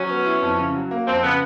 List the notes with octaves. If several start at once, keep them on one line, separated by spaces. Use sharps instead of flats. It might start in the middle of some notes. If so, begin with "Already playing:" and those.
Already playing: F#3 C#4
B3
E4
F2
C#3
F#3
A#3
F2 C4
C#3 B3